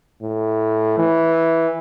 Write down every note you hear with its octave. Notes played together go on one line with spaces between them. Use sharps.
A2
E3